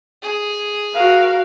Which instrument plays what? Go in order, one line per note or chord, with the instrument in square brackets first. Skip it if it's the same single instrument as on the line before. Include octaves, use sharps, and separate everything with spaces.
[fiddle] G#4
[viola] F#4 A#4 [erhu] F5